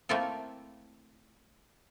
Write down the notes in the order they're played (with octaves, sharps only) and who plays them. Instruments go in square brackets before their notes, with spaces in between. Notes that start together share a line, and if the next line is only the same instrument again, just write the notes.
[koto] A3 A#3 C4 E4 F4 A4